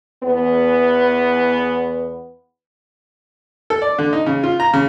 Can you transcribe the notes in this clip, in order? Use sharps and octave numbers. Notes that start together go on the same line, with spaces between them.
E2 B3
A4
D5
D3
D#4
C#3
F4
A#5
C#3